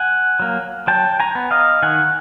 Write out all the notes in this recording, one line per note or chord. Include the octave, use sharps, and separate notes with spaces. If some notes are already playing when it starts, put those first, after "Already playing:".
Already playing: F#5 G#5
F#3 A#3
F#3 G5 A5
G#5 A#5
B3
D#5 F5
D#3 F#5 G#5